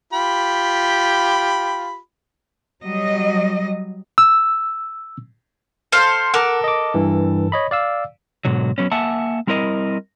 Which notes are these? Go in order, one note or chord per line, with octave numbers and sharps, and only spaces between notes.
F4 G4 B5
F#3 G3 D#5
E6
A4 C5 F5
A4 A#4 F#5 D6
D#5 D6
G2 E3
C#5 D#5 B5
D5 F5 E6
G#2 B2 D3 F#3
F#3 B3 C#4
A#3 E5 F#5 G#5 A5
G3 C4 E4 A#4 D#5